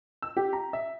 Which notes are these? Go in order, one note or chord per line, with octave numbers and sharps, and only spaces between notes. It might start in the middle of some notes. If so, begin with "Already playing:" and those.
E6
G4
A#5
E5